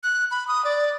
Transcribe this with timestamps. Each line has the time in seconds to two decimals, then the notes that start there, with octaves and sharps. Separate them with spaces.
0.03 F#6
0.31 B5
0.48 D#6
0.65 D5